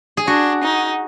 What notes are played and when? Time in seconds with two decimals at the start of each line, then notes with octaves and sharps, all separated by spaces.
0.17 G#4
0.27 D4 F#4
0.63 D#4